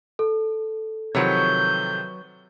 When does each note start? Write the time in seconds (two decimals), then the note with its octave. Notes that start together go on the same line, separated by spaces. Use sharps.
0.19 A4
1.15 C3 D#3 F3 F#3 B4 C#5 G6